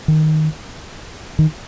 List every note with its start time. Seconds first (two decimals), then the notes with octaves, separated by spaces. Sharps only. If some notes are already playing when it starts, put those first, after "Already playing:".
0.08 D#3
1.39 D#3